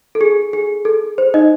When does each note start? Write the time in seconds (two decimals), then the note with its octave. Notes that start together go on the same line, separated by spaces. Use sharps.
0.15 A4
0.21 G#4
0.53 G#4
0.85 A4
1.18 C5
1.34 D#4 D#5